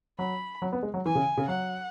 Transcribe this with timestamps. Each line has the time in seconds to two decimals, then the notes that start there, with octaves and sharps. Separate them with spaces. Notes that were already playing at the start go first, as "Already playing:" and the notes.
0.18 F#3 B5
0.62 F#3
0.72 B3
0.83 G#3
0.94 F#3
1.05 E3 G#5
1.15 C#3
1.37 C#3
1.48 F#3 F#5